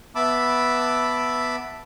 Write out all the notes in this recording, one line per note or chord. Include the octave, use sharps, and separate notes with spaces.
B3 E5 A5 B5 D6 E6